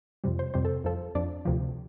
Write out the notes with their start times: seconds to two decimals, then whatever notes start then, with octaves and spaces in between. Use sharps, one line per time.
0.24 F2 C3 G3
0.39 C5
0.54 F2 C3 G3 C5
0.65 A4
0.84 F2 F3 A4
1.15 F2 F3 D4 D5
1.45 D2 C3 F3